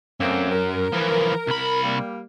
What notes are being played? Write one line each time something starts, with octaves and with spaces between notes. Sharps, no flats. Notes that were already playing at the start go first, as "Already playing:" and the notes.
F#2 A3 A#3 C4
A#4
E3 F3
C2 B5
G3 A#3